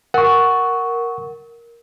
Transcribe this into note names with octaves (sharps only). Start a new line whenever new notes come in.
A#4 F#5 C#6